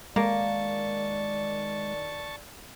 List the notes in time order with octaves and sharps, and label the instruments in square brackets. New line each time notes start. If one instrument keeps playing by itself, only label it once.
[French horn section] D#3 D5 [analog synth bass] G#3 [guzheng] A#3 [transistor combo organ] A5 C#6